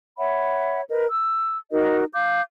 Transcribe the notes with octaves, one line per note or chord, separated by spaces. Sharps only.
C#5 E5 F#5 B5
A#4 B4 D#5
E6
D#4 F#4 A#4 D#5
F5 D6 G6